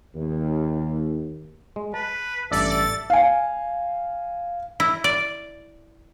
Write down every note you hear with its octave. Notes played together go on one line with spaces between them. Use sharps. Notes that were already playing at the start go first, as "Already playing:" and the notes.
D#2
G#3
B4 A5
A1 G2 A4 D5 E5
A6
F5 G#5
E4
D5